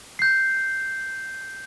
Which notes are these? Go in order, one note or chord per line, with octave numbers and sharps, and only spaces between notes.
G6 C7